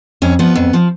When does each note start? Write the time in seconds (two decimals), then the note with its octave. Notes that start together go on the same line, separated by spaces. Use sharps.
0.22 F2 C#4
0.39 F3 B3
0.55 F2
0.73 F3